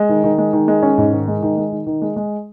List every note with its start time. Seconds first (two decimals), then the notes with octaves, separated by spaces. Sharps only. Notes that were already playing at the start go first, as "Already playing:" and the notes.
Already playing: G#3
0.09 D#3
0.24 D#3
0.38 G#3
0.53 D#3
0.68 G#3
0.83 C#4
0.98 G#2
1.13 D#3
1.28 G#3
1.43 D#3
1.57 G#3
1.72 D#3
1.87 D#3
2.02 G#3
2.16 G#3